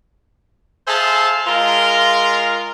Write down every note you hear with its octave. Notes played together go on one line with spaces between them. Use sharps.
G#4 A4 C5 E5 F5 A5
G#3 F4 A#4